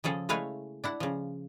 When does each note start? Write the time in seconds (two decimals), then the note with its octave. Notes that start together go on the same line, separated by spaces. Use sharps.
0.04 C#3 F3 G#4 A4
0.29 G#3 A3 E4 B4 C#5 F5
0.84 D4 E4 F#5
1.00 C#3 F3